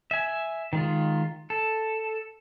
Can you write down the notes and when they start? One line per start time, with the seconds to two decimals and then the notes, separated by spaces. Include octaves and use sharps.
0.11 E5 G#5
0.73 D#3 G#3 F4
1.50 A4